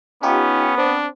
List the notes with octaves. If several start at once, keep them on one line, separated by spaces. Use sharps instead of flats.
B3 C#4 D#4 F4 G4
C4 D4